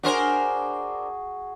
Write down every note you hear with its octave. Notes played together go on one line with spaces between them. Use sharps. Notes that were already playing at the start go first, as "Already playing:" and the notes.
D4 F#4 G#4 A#4 C5